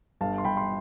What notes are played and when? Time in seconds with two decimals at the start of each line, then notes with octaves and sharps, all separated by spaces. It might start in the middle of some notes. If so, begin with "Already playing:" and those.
0.21 G1 F5 A5
0.38 C6
0.44 G1 G5 B5
0.57 C6